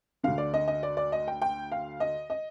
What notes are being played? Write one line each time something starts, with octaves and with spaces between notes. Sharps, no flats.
D2 D3 F5
D5
D#5
D#5
D5
D5
D#5
G5
G5
F5
D#5
D#5